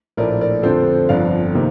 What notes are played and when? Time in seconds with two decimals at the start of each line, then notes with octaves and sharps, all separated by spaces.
0.17 A#1 A2 A3 A#4 D5
0.41 A#4 D5
0.63 F2 D3 F3 C4 A4 C5
1.09 G1 F2 D3 D5 F5
1.54 C3 D#3 A#3